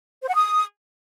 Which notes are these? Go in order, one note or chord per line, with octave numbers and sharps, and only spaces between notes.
C5
F#5
D#6